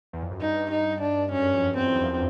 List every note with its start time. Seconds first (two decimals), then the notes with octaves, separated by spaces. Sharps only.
0.13 E2
0.23 F2
0.31 F#2
0.41 G2 D#4
0.71 D#4
1.01 D4
1.32 F#2 C#4
1.54 F2
1.77 E2 C4
1.95 E2
2.00 F2